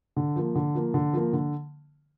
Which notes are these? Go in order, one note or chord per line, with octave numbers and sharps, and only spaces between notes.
D3
F3 A#3
D3
F3 A#3
D3
F3 A#3
D3